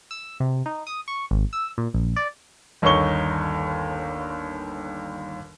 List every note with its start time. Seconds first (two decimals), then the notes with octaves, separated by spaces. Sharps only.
0.11 E6
0.40 C3
0.66 D#4
0.87 D#6
1.08 C#6
1.31 G#1
1.53 E6
1.78 A#2
1.94 A#1
2.16 D5
2.82 G1 D#2 D#4 C#5 C#6 G7